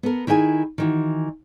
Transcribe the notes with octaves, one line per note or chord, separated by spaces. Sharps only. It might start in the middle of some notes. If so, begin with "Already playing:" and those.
B3 A4 A#4
D#3 E4 G#4 G5 G#5
D#3 E3 F#4